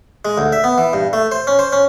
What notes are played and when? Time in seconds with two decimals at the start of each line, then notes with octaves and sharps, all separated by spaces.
0.25 G#3
0.38 D2
0.52 E5
0.64 B3
0.78 E3
0.93 G2
1.13 A3
1.32 C5
1.47 C#4
1.59 C5
1.73 C#4